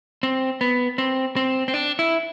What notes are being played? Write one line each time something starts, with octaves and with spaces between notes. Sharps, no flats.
C4
B3
C4
C4
C4
D4
E4